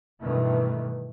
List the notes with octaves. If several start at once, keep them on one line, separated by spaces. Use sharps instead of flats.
G2 B2 D#3 E3 A3